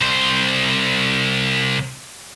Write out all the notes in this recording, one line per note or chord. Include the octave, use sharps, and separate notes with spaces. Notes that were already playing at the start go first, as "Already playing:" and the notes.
C2 C5